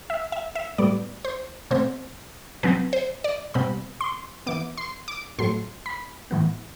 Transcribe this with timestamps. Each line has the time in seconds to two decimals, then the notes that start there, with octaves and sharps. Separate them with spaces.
0.10 E5
0.32 E5
0.55 E5
0.78 A2 G3 B3 D5
1.25 C5
1.71 B2 A3 C4 C5
2.63 B2 F#3 C4 B4
2.93 C5
3.24 D5
3.54 B2 G3 C4 B5
4.01 C6
4.46 E3 B3 D6
4.77 C6
5.08 D6
5.39 A2 F#3 A3 C6
5.86 B5
6.31 A2 E3 B3